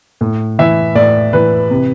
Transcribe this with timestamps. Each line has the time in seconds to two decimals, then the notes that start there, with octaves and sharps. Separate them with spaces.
0.21 A2
0.59 E3 E5
0.95 A2 D5
1.33 E3 B4
1.70 C3